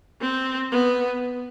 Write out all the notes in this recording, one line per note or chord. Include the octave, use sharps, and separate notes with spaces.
C4
B3